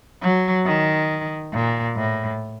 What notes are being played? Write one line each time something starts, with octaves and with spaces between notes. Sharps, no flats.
F#3
D#3
A#2
A2